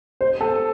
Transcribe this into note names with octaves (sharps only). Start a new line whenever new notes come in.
C5
A4